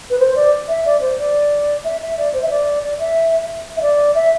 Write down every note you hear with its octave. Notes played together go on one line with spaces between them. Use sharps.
B4
C5
D5
E5
D5
C5
D5
E5
E5
D5
C5
E5
D5
D5
E5
E5
D5
E5